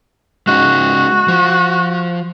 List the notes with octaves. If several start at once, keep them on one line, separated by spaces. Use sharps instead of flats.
G#3 C#4 D#4 F#4
F3